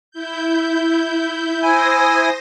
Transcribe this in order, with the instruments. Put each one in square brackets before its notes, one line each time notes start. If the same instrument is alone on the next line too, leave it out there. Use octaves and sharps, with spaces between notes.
[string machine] E4 G6
[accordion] E4 G#5 [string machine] C5 D#6 A#6